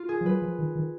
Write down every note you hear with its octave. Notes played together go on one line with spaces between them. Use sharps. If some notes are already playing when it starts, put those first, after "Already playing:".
Already playing: F4
G#4
F3
F#3 B4
F3
D#3
D#3